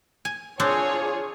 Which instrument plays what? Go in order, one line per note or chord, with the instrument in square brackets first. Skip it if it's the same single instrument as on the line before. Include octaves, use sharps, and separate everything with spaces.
[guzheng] G#5
[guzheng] C4 D4 [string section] F4 G#4 C#5